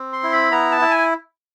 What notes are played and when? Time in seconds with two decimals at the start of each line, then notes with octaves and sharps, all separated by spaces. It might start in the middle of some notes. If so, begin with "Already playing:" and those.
Already playing: C4
0.13 C6
0.23 E4
0.32 B5
0.51 B3 A#5
0.72 A5
0.81 E4
0.91 G#5